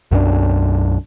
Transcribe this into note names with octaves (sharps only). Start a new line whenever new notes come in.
B1 F#2 E3 D4